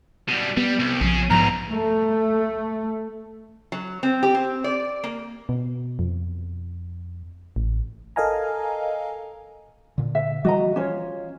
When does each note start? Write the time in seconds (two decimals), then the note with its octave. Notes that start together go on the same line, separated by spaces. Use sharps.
0.28 B2 G3
0.57 G3 B3
0.79 C2
1.01 A#1 F3 C#4 G#4
1.30 E2 G#2 B2 F3 A#5
1.70 A3
3.72 F#3
4.03 C4
4.23 G4
4.35 C4
4.64 D5
5.04 A#3
5.49 B2
5.99 F2
7.56 A1
8.16 A4 A#4 D#5 F5 G#5 A#5
9.98 A#2 D3
10.15 E5
10.44 E3 F3 G3 F#4 D#5 A#5
10.76 C#4 F4 C#5